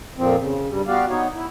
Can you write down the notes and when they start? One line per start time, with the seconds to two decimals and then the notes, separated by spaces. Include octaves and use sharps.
0.18 F2 A#2 F3 C4
0.40 C#3
0.69 G2 G3
0.88 B3 F#4 G4 D5 F5
1.10 B3 D#4 C#5
1.35 E4